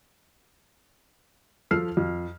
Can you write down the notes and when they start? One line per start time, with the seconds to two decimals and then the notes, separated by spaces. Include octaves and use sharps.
1.71 F3 A4 F6 C7
1.97 F2